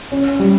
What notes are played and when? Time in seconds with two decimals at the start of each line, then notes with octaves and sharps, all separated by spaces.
0.12 C#4
0.40 G3